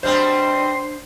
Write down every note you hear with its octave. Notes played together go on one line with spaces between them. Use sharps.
B2 G3 C4 D4 C5 C6